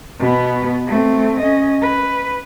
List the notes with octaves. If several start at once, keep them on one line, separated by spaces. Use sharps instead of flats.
B2 B3
A3 C4
C#4 D#5
B4